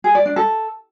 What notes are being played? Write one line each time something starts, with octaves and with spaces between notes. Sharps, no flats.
G#4
D5
D4
A4